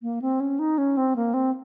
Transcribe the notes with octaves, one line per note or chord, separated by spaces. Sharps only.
A#3
C4
C#4
D#4
C#4
C4
A#3
C4